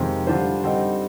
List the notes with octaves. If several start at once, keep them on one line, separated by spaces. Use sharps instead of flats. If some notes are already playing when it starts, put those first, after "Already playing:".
Already playing: F2 C3 D#3 G#3 C4
D3 G3 D4 F4 C5
D3 G3 C4 D#4